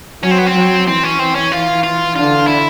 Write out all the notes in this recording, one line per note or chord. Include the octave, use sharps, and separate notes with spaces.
F#3 C#4
C4
B3
C4
F#3
E3 C4
C#4
C4
C#4
F4
F4
D3 F4
E4